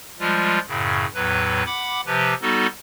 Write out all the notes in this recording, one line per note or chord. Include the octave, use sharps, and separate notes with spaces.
F3 G3 G#3 F4
F#2 A2 C#3
E2 A2 F#3 B4
F#5 B5 D6
C3 F3 G4 B4
G3 B3 D#4 F#4 A4